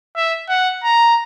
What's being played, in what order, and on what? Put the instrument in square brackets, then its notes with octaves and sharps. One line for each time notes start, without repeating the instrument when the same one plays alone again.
[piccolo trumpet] E5
F#5
A#5